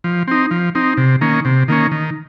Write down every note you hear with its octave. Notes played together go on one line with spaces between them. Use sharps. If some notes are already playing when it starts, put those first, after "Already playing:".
F3
C4 D#4
F3
C4 D#4
C3
D#3 A#3 C#4
C3
D#3 A#3 C#4
D#3